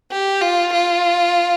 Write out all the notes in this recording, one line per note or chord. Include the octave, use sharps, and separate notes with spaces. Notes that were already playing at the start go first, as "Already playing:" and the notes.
G4
F4
F4